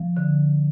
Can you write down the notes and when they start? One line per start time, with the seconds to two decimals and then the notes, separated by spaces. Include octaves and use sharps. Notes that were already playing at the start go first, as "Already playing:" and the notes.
Already playing: F3
0.17 D3